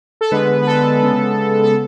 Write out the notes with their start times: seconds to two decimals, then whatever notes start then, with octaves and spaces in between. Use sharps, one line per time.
0.21 A4
0.31 D3 G#3 B3 B4
0.62 B4
0.67 A4
1.02 C#3 G#3 B3
1.63 A4